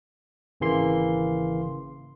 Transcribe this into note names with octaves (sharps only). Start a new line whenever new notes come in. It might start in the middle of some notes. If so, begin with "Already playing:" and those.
G#1 C#3 E3 A#3 C6